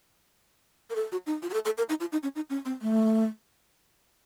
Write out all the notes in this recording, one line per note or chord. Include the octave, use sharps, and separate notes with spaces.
A#4
A4
F#4
D#4
F4
F#4
A4
A4
A#4
D#4
F4
D#4
C#4
D#4
C#4
C4
A3